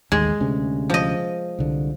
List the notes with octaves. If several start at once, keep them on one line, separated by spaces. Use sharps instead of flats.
A1 D#2 G#3
D2 C3 C#4
F3 D#5
C2 D3